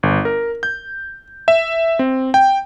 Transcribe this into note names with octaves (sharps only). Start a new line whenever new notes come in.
G1
A#4
G6
E5
C4
G5